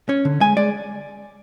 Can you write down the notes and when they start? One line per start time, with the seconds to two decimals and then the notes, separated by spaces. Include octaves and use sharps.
0.09 C#4 C#5
0.25 D3
0.41 G#3 G#5
0.57 G#3 D5